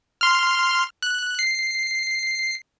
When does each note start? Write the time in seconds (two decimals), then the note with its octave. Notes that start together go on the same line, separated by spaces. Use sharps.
0.21 C6 F6
1.02 F#6
1.39 C7